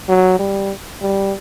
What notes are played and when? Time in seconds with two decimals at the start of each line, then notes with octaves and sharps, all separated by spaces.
0.09 F#3
0.39 G3
1.02 G3